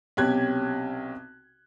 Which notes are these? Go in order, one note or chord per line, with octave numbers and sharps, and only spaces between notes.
B1 C3 C#4 G4 F#6 G#6